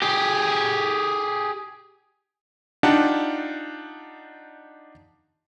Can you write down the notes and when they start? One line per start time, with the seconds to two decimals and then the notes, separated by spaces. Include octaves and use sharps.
0.02 G4 G#4
2.83 D4 D#4 F4 G4 F#5 A5